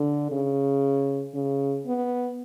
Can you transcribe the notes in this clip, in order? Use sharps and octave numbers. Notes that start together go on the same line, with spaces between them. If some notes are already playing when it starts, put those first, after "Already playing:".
Already playing: D3
C#3
C#3
B3